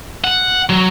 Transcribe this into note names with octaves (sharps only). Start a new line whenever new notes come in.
F#5
F#3